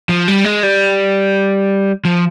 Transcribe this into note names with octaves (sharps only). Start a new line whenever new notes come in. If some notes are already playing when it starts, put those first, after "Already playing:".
F3
G3
G#3
G3
F3